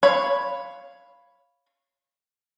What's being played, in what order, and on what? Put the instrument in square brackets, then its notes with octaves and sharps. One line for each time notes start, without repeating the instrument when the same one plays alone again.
[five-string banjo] C#5 F5 B5